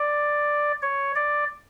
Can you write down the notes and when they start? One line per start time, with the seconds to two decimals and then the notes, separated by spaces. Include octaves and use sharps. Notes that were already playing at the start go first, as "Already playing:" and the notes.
Already playing: D5
0.82 C#5
1.15 D5